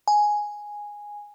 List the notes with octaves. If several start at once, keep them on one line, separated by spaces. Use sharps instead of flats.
G#5